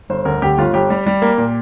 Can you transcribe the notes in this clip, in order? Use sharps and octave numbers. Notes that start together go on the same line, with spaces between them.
G1 C5
D2 A#4
D2 G4
G1 F4
G1 G4
G3
G3
A#3
A#2